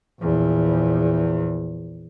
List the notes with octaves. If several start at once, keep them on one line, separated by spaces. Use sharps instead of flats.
A#1 E2